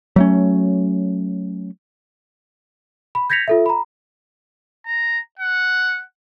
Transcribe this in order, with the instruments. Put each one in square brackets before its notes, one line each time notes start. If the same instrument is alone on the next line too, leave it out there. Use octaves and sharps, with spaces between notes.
[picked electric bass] F#3 A3 C#4
[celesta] B5
G6 G#6 A#6 B6 C#7 F7
F4 A4 E5
A#5 B5
[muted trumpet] A#5
F#5